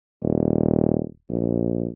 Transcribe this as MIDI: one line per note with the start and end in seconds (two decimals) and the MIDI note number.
0.22 1.03 27
1.29 1.87 34